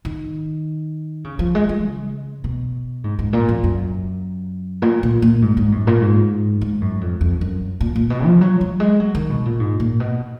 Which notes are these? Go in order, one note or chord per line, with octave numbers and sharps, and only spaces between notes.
D#3
C#3
F3
G#3
G#3
C#3
B2
G#2
G#2
A#2
F2
F#2
A#2
A#2
A#2
G#2
G#2
F#2
A#2
G#2
G#2
F#2
F2
F2
F#2
A#2
A#2
B2
F3
F#3
F#3
G#3
F#3
D#3
B2
A#2
G#2
A#2
B2